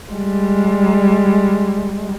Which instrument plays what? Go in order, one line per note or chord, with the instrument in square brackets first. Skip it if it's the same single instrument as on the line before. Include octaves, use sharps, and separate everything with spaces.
[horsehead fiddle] G3 G#3